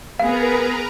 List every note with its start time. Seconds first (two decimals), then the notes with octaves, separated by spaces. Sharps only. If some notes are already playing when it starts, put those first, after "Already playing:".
0.19 B3 G#4 A#4 B4 F5 A#5